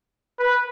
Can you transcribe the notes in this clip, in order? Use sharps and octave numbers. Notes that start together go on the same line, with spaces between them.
B4